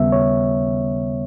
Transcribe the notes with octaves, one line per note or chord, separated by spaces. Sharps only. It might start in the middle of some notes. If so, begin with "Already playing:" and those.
Already playing: D#2 C#3 G3 B3 E5
C#5